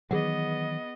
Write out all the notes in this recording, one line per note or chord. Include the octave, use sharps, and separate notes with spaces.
D#3 E3 F#3 B3 G#4 D#5 F#5